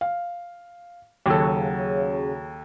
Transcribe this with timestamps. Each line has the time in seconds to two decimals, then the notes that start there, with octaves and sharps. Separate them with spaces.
0.01 F5
1.26 D#2 C#3 F#3 A4